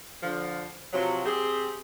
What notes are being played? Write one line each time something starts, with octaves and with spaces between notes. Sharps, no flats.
D3 F3
C3 F3 F#3
C4 G4 G#4